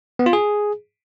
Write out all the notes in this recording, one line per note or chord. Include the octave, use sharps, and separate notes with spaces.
B3
F4
G#4